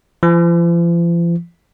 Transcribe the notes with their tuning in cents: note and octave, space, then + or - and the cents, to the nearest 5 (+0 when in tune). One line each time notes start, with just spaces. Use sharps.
F3 -45